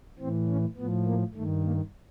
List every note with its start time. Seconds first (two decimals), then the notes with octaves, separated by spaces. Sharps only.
0.19 A2 E3 C4
0.48 C#4
0.77 A2 F3 B3
1.06 A#3
1.34 G2 D#3 A3
1.63 A#3